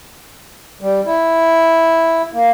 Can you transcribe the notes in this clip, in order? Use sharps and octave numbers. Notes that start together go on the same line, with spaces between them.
G3
E4
A#3